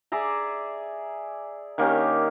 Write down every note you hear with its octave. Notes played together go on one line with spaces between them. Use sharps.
G#4 D5 E5 A#5
D#3 A#3 C#4 G4